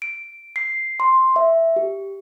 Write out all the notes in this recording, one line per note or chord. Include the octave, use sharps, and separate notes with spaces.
D7
C7
C6
E5
G4